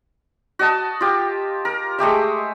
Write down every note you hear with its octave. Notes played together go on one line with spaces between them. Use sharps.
F#4 D#5 A5
F4 G4
A#4
G#3 A3 G4 E5